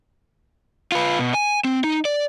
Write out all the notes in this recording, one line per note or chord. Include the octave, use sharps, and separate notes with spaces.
F4 B4
B2
G#5
C4
D#4
D5